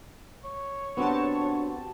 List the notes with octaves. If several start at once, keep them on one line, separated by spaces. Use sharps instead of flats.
C#5
D3 B3 C4 F#4 G4 A5